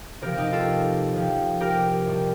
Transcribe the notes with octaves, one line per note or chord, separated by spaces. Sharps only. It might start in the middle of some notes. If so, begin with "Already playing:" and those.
C3 F3 G4 A#4
D#4 G4
F4 A4
C3 F3
G4 A#4
A2 G3